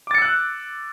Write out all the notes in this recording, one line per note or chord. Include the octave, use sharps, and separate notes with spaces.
D6 E6 F#6 A6 C#7